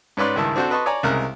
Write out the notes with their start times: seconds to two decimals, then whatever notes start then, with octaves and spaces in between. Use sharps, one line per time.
0.17 G#2 C#4 B4 D5 C6
0.36 C#2 G2 D#3 E4 A5
0.56 C4 D4 F#4 A4 C5
0.71 B4 D#5 A5 C6 C#6
0.86 C#5 D5 G#5 A#5
1.03 C2 C#3 G#3 A#4 F6 F#6